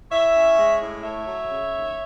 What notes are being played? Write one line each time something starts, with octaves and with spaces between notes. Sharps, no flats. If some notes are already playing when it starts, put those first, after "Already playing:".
E4 C#5 E5
C#4
G#3
A2
A3 C#5 E5
F#3
C#3
D#2